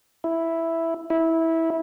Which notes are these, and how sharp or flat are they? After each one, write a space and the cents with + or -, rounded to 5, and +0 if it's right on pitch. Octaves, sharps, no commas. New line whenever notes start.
E4 +0
E4 -15